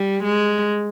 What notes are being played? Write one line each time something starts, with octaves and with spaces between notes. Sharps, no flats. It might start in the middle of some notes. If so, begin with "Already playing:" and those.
Already playing: G3
G#3